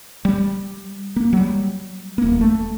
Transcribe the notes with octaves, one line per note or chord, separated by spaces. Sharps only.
G3
A#3
F#3 G3
D#1 A#3
A3